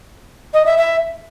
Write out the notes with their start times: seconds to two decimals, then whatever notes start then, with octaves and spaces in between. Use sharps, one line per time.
0.54 D#5
0.66 E5
0.78 E5